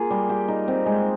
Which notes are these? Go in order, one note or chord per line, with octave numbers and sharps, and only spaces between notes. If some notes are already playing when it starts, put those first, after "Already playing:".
Already playing: A#3 F4 G#4
G3
G4
D#4
C4
G#3